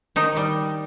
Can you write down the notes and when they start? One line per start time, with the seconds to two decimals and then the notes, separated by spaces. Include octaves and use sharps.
0.16 D#3 D#4
0.37 G3